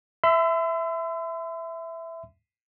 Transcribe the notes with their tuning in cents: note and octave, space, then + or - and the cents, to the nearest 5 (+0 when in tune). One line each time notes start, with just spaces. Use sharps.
E5 +0 C6 -45 E6 +20